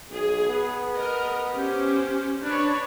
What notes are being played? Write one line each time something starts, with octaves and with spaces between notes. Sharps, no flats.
B1 G#4
B3
A#4 D#5
C#4 G4 C5
D4 B4 C#5